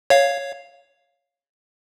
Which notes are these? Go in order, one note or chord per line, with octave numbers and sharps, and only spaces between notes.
C#5 F5